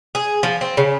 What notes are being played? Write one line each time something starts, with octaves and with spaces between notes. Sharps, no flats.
G#4
F3
C4
C#3